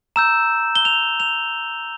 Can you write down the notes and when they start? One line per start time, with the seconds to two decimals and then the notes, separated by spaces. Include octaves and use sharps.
0.16 A#5 E6 G6 E7
0.75 G7
0.85 F7
1.20 F7